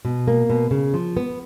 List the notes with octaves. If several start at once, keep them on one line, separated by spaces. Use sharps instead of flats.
B2
A#3
B2
C#3
F3
B3